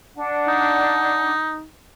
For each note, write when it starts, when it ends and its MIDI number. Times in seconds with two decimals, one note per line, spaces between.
0.16 1.30 62
0.16 1.30 78
0.48 1.64 63